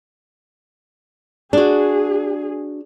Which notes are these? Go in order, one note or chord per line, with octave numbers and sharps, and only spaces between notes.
D4 F#4 G#4